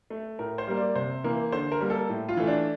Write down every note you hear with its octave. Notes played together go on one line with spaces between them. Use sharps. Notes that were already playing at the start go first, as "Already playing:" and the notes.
A3
A2 A#4
C5
G3 A#3
D5
C3 C5
E3 A#3
D3 C5
A#4
G3 A#3
A4
A2
F4
E3 A3
D4